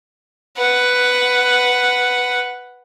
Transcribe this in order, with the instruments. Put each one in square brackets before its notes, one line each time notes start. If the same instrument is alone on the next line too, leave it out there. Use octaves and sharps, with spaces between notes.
[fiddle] B4 F#5